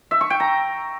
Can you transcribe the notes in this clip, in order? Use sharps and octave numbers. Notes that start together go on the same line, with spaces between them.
E5
C#6
G5
A#5